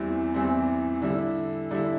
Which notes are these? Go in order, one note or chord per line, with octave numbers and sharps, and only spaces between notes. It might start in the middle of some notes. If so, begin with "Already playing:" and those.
Already playing: E2 E3 G3 C4 E4
E2 E3 G3 C4 E4
D3 G3 E4
D3 G3 E4